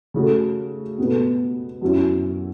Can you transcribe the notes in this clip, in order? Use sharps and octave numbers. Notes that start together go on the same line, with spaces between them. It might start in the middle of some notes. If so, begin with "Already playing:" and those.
C#3 A3 F#4 A4
B2 B3 A4
F#2 F#3 C#4 E4